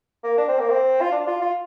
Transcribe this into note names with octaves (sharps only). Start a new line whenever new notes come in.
A#3
D4
C4
A#3
C4
F4
D4
F4
F4